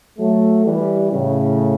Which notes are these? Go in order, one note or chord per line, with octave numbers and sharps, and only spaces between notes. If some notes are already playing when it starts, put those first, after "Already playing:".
F#3 A3
E3 G3
A2 C#3